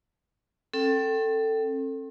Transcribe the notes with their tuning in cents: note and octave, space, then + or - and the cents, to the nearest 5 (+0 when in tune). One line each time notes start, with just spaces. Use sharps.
C4 +45 A4 +15 G5 -25